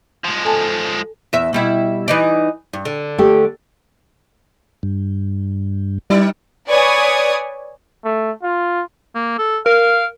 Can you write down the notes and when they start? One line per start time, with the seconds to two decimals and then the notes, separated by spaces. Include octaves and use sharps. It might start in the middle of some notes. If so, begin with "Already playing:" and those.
0.24 F3 G#3
0.45 A4 G#5 A5
1.33 E2 E5
1.53 B2 G3 E4
2.08 E3 D#4 D5
2.73 G2
2.85 D3
3.18 A3 G4
4.83 G2
6.10 G2 G3 D#4 D5
6.67 B4 C#5 D5 G#5 C#6 D#6
8.05 A3
8.43 F4
9.15 A#3
9.38 A4
9.66 A#4 F5